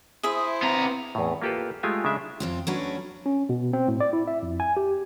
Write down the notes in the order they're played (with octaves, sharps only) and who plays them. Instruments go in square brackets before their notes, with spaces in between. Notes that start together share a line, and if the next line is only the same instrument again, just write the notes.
[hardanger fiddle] E4 C5 [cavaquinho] G#4 E5 [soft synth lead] D#6
[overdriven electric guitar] B3 A#5 [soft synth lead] C4
[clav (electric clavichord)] E2 A2
A#3 F4 G4 A4 B4
G#3 A3 F4 G4 G#5
C#3 G#3 D4 E5
[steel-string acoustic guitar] F2 C4 F4
F#3 A3 C#4 D4 F#4 B4
[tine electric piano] C#4
B2
C4
A2
D5
E4
E5
F2
G#5
G4